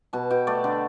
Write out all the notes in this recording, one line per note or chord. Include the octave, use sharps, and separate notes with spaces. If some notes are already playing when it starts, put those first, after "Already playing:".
B2 A5
B2 G5
A3 D5
D3